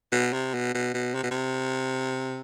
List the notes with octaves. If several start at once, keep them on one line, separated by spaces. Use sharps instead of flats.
B2
C3
B2
B2
B2
C3
B2
C3